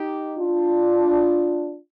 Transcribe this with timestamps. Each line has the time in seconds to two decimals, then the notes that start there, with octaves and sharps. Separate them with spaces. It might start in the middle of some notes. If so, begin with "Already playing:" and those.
Already playing: D#4 G4
0.37 D4 F4